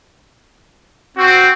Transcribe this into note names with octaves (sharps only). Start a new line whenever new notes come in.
C4 F#4